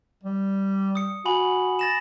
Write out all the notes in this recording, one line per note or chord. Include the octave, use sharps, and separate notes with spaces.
G3
D#6 C#7
F#4 G#5 B5 F#7
A6 A#6 E7